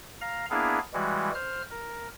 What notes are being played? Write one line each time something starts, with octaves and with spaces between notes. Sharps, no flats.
F5 A#5
A#3 B3 D4 E4 G#4 F5
E3 G3 G#3 F#4
C5 F6
A#4